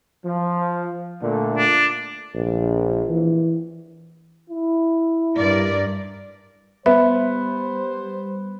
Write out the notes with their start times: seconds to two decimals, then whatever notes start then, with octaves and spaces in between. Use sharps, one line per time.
0.25 F3
1.23 A#2 D3 A3
1.58 D4
2.35 A#1
3.09 E3
4.50 E4
5.38 G2 A#4 D5
6.86 G3 B3 C5 E5